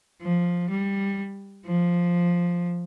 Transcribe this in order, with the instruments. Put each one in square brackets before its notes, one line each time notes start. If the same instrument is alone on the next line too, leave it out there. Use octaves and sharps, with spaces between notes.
[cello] F3
G3
F3